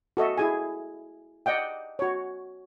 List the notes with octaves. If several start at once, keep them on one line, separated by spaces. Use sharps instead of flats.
F#4 A4 D#5 E5
E4 G#4 G#5
D5 D#5 F#5 G5
F#4 C#5